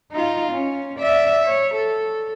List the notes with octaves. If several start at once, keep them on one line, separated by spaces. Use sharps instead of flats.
D#4 F4
C#4
D5 E5
C#5
A4